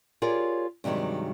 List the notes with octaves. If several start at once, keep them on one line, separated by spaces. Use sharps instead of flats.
F4 G4 G#4 A#4 C#5 D5
G2 C3 D#3 F#3 G#3